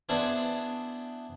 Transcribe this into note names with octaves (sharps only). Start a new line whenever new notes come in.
B3 D4 E4 G#4 C5